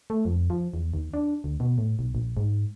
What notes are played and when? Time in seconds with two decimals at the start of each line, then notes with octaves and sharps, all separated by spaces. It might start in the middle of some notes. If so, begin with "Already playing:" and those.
0.10 A3
0.25 F2
0.50 F3
0.74 E2
0.94 D#2
1.14 D4
1.44 D2
1.60 B2
1.78 A2
1.99 B1
2.15 A#1
2.37 G#2